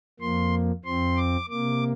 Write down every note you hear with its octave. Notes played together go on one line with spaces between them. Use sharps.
F2 F3 A#3 C6
F2 F3 C4 C6
D6
C3 A#3 D6